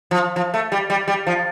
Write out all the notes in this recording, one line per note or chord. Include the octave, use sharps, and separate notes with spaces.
F3
F3
A3
G3
G3
G3
F3